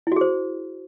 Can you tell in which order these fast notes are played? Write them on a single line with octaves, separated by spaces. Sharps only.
E4 F#4 G#4 C5